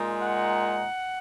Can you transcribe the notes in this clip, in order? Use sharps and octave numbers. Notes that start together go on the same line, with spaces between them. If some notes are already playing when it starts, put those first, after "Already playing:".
Already playing: A#2 G#3 D#4
F#5